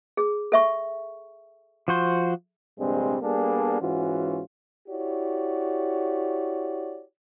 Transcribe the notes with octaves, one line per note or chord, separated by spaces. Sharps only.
G#4
A4 E5 C#6
F3 F#4 C5
A#1 G2 C3 G3 G#3 C4
G3 A#3 B3 D4 G#4 A4
G#2 E3 C#4 F4 F#4
E4 F#4 G4 C#5 D5